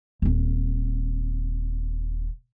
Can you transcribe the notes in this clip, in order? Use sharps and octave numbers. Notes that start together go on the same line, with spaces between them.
D#1 C4